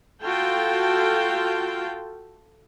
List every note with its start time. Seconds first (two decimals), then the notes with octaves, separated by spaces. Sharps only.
0.23 F4 F#4 A4 G5